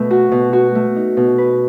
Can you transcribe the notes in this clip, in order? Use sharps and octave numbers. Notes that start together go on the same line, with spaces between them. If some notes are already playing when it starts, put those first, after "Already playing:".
Already playing: B2 A3
F#4
B2
F#4
A3
D#4
B2
B4